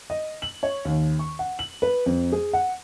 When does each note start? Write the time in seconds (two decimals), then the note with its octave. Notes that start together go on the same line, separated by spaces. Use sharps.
0.10 D#5
0.42 F#7
0.63 C#5
0.85 D#2
1.19 C#6
1.39 F#5
1.59 F#7
1.82 B4
2.06 F2
2.32 G#4
2.53 F#5